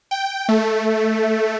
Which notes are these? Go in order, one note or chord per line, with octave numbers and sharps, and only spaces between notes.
G5
A3